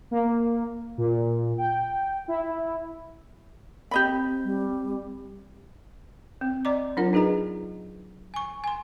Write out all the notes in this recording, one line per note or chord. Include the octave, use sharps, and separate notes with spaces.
A#3
A#2
G5
E4
C4 G4 D#5 B5
G3
C4
D5 D#5 A#5 D6
F#3 D4 F4 A#4 F#5
D#4 G#4 B4 D#5 A#5
G#5 C#6
G#5 C6